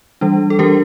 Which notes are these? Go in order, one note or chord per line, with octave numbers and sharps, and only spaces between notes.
E3 G3 D4
A4
E3 G3 D4 G4 A#4